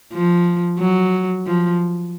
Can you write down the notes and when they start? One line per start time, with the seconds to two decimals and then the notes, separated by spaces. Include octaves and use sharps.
0.13 F3
0.79 F#3
1.46 F3